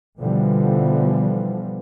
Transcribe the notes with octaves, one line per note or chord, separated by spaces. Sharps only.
B2 D3 E3 F3 G3 B3